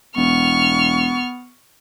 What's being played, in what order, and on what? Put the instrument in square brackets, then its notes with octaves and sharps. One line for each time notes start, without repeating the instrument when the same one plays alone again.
[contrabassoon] E1 [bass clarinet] B3 [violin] C#6 F6